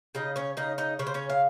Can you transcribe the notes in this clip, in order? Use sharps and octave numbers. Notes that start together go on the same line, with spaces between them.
C#3 D#4 D#5
C#4 C#5
C#3 D#4 D#5
D#4 D#5
C#3 C#5
C5
C#4 C#5
F5